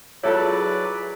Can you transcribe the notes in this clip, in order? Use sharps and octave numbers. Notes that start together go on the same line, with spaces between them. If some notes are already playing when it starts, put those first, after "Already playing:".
F#3 E4 F4 G#4 A4 B4 C#5 D5